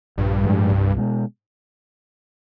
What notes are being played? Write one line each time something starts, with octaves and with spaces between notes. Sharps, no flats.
A#1 G2
A2 F3 G#3
C2
B2 G#3